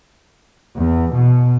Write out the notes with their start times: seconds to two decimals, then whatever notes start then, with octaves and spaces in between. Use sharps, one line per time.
0.76 E2
1.13 B2